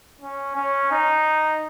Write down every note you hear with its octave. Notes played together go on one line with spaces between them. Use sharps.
C#4
C#4
D#4